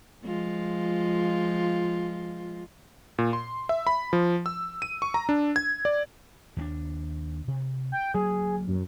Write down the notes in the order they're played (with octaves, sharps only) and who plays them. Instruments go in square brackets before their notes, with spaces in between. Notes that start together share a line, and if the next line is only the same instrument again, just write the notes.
[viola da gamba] F3 G#3 F4
[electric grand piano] A#2
C6
E5
B5
F3
E6
D#7
C#6
A#5
D4
G#6
D5
[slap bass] D#2 G#3 D4
C3
[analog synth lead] G5
[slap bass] D2 F#3 A#3 [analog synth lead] G#4
[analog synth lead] F#2